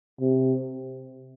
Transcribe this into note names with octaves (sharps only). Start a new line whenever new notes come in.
C3